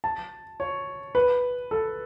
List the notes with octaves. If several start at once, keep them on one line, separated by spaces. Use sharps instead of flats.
A5
C#5
B4
A4